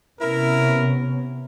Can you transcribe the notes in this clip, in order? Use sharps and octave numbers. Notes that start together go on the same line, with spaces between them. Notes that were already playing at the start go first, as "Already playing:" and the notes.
C3 B3 C#4 E4 A#4